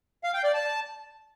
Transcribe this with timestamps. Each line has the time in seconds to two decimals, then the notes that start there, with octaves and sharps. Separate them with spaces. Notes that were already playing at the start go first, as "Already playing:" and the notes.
0.24 F5
0.34 G5
0.44 D5
0.54 A5